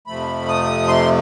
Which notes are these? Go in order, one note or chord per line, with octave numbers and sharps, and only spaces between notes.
F2 C3 F3 A3 B5
D#6
C6